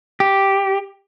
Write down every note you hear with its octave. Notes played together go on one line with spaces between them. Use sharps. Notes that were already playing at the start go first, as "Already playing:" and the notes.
G4